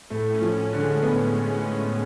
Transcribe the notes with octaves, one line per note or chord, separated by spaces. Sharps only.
A2 A3
C#4
F3
A2
D3
G#3
A2 B3
A2
C#4
A2